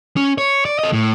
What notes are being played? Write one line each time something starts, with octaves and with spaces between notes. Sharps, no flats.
C#4
C#5
D5
A4 D#5
A2